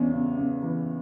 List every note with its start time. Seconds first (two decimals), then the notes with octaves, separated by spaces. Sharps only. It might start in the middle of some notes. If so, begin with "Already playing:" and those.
Already playing: E2 E3 C#4 D4
0.12 C#3
0.38 C#3
0.63 E3